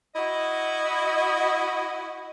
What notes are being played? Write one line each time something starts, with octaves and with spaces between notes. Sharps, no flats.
E4 F#4 D#5